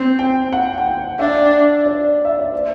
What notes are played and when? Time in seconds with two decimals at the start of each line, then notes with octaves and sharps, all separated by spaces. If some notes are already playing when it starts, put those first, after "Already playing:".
Already playing: C4 G5
0.19 G5
0.52 F#5
0.78 G5
0.86 F#5
1.19 D4 E5
1.86 D5
2.25 E5
2.39 D5
2.52 C5